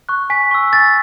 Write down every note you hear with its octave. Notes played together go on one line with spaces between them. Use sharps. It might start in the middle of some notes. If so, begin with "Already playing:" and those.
C#6 F#6
G#5 B6
C#6 E6
G#5 A6